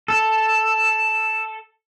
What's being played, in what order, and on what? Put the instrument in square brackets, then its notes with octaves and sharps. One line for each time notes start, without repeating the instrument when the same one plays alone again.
[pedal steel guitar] A4 [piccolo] E7